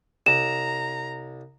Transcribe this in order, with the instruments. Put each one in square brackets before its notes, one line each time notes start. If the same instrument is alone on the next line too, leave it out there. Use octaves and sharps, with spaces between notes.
[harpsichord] C2 [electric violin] A#5 [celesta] E7